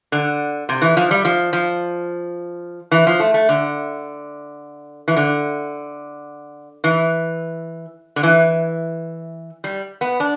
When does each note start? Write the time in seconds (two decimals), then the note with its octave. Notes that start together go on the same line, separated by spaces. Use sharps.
0.12 D3
0.69 C3
0.82 E3
0.97 F3
1.11 G3
1.25 F3
1.53 F3
2.91 E3
3.07 F3
3.20 A3
3.34 A3
3.49 D3
5.08 E3
5.17 D3
6.84 E3
8.16 D3
8.23 E3
9.64 G3
10.01 B3
10.20 D4